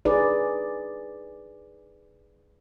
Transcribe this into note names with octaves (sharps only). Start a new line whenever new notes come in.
D#4 G#4 B4 D5